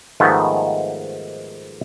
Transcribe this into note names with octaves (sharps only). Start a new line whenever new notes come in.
G#2 D#3 F3 G3 A3 B3